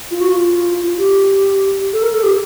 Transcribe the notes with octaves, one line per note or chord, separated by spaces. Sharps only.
F4
F#4
F4
F4
F4
G4
A4
A#4
A4
G4